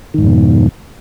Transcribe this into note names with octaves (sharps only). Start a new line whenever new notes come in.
F2 G#2 B2 D#3